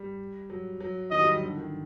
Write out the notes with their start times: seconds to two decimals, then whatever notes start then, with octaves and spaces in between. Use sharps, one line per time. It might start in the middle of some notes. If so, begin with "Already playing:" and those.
Already playing: G3
0.50 F#3
0.81 F#3
1.11 D#3 D#5
1.21 G3
1.31 F#3
1.41 D3
1.57 D#3